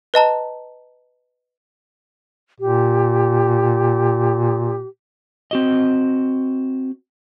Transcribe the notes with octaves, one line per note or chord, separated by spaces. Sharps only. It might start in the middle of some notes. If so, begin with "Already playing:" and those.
B4 D#5 A5 A#5
A#2 G4
C4 F#4 D#5